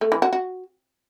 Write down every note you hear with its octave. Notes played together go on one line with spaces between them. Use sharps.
A3
E3
F#4
F#4